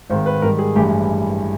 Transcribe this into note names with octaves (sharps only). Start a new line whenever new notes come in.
G#1 G#2 D#3 C5
B4
G#2 D#3 G3 A#4
G#4
A1 G2 E3 G#3 G4